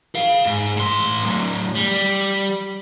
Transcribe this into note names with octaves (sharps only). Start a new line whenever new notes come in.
G#4 F5
G#2
A2 C6
A2 F#3
G3